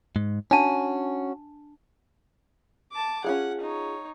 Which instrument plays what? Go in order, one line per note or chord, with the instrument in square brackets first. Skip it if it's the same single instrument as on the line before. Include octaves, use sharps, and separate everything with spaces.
[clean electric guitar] G#2
[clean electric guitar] C#4 F#4 [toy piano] D4 A5
[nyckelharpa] A5 D6
[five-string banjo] C#4 F4 G#4 [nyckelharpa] F#5
[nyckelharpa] D#4 C#5